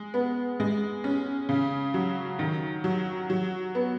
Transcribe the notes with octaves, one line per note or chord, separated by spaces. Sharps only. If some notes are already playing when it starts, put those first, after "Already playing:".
Already playing: G#3
B3
G#3
C#4
C#3
F#3
D#3
F#3
F#3
B3